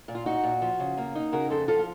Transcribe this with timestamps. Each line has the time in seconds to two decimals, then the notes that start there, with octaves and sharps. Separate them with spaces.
0.08 A#2
0.15 F4
0.26 D#4 F#4
0.43 A#2
0.62 F3
0.80 C#3
0.98 A#3
1.15 D#4
1.32 C#3 F#4 A#4
1.50 F2 A4 C5
1.68 F3 F4 A4
1.79 F4